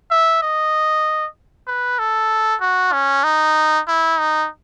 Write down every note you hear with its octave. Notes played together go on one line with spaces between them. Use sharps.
E5
D#5
B4
A4
F#4
C#4
D#4
E4
D#4